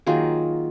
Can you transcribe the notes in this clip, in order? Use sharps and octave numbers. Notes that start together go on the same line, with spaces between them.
D#3 F#3 A#3 F4 G#4